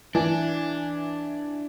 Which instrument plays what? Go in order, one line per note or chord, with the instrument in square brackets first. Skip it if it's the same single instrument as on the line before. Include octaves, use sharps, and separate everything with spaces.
[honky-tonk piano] E3 [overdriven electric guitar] D4